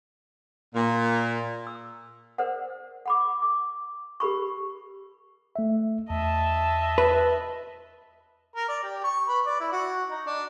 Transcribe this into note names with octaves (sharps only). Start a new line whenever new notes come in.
A#2
E6
A#4 C5 D5 F#5
F#5 B5 D6
D6
G4 A#4 B5 C#6
A3 E5
E2 D#5 E5 A5
B4
A#4
D5
G4
C#6
B4
D5
E4
F#4
D#4
D4